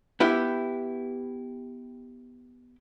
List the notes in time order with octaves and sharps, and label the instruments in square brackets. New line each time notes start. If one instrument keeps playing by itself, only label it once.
[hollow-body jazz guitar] B3 E4 G4